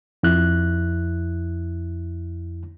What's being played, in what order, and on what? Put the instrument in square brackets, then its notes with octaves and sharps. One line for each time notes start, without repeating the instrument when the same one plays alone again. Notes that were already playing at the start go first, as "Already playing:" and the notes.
[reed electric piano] F2 E4 F#6